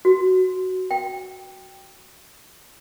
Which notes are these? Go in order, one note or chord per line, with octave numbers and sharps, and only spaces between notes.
F#4
G5